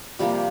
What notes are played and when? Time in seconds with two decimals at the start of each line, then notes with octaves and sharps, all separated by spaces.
0.19 C3 F3 G3 A#3 G4